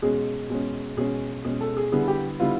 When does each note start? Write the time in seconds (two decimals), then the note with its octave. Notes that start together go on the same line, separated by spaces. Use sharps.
0.02 B2 G#3 C#4 G#4
0.50 B2 G#3 C#4
0.97 B2 G#3 C#4 G#4
1.45 B2 G#3 C#4 G#4
1.61 A4
1.77 G#4
1.92 D3 G3 B3 E4 G#4
2.08 G4
2.40 D3 G3 B3 E4 F4